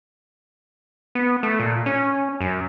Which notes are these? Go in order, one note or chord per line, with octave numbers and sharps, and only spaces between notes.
B3
A3
A#2
C#4
F#2